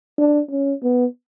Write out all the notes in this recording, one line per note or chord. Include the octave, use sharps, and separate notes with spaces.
D4
C#4
B3